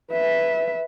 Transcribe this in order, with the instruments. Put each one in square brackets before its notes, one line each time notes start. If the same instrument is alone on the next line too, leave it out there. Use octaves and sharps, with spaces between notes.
[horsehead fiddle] B4 E5